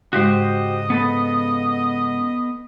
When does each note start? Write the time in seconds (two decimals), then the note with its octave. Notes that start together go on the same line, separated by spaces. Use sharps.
0.13 G#2 C#3 F#4 G4 C5 D#5
0.90 B3 A4 B4